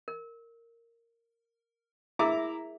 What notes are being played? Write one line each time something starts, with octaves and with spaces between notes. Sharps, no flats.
A#4
E4 G#4 A#4 E5 A#5 D6